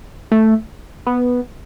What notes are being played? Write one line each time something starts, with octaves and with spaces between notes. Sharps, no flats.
A3
B3